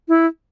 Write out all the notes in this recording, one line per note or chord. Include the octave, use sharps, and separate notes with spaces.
E4